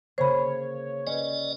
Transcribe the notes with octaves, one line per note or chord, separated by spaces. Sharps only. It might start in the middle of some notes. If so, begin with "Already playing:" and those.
C#3 A#3 C5 C#5 B5
C#4 B4 D5 D#5